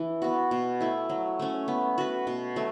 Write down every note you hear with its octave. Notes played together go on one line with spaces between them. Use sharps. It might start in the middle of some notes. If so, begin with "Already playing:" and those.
Already playing: E3
B3 F#4
B2
A3 E4
F#3
A3 C#4
B3
F#4 B4
B2
F#3 A3